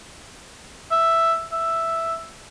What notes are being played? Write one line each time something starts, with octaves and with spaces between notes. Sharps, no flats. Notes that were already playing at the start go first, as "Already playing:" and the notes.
E5
E5